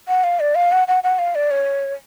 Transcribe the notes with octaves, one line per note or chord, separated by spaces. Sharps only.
F#5
F5
D5
F5
F#5
F#5
F#5
F5
D5
C#5